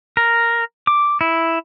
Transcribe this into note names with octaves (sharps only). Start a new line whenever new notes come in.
A#4
D6
E4